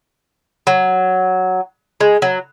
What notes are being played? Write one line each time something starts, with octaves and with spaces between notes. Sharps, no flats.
F#3
G#3
F#3